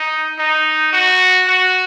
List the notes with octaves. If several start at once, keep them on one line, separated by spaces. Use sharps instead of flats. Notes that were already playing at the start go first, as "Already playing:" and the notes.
Already playing: D#4
D#4
F#4
F#4